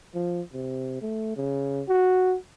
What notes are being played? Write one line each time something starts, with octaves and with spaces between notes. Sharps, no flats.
F3
C3
A3
C#3
F#4